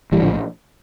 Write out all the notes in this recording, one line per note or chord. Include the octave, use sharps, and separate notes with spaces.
A#1 A2 E3 G3
D3 F3